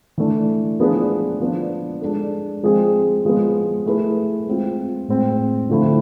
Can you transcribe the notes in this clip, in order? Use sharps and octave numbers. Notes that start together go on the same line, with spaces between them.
E3 A3 D4
F3 B3 D4 G#4 B4
F3 B3 D4
G#3 D4 A4
F3 G#3 C4 G#4
F3 G#3 B3
A3 E4 G#4 B4
G#3 C4 F4
A2 G#3 C4
D3 F3 A3 C4 E4